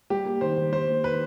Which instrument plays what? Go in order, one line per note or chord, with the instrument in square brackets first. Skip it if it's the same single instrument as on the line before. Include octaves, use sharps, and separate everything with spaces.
[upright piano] G3 [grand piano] G4
[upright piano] A#3
[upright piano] D#3 [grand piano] C5
[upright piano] D#3
[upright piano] G3 [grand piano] C5
[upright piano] A#3
[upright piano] D#3 [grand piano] B4